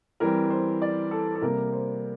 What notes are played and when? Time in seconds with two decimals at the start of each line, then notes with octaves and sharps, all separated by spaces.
0.20 E3 G3 C4 A#4
0.50 C5
0.82 D5
1.11 A4
1.35 A4
1.42 C3 G3 A#3 A#4
1.72 C5